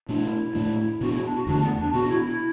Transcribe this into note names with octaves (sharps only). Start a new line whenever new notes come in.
B2 A3 D4 E4
A2 A3 D4
B2 B3 D4 F#4
E4
D4
F#4
E2 D3 A3 D4
B3
D4
B2 B3 D4 F#4
E4
E4